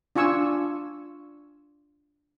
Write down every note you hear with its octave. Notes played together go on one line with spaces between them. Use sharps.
D4 F4 G#5 C#6 E6